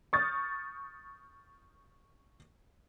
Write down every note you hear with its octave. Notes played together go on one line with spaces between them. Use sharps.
C#6 D#6 F6 G6 A6